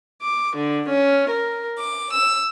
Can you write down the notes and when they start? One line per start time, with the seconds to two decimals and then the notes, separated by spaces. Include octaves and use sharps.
0.23 D6
0.56 D3
0.89 C#4
1.31 A#4
1.79 D6
2.14 E6